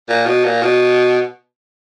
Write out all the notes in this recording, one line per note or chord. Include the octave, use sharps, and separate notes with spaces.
A#2
B2
A#2
B2